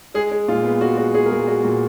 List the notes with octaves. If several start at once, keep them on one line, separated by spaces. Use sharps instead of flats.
G#3 G#4
G#3
A#2 F4
G#3 B3
G#3 F#4
G#3 F#4
G#3 G#4
A#4
A#2 G#4
G#3 F#4
A#2 F#4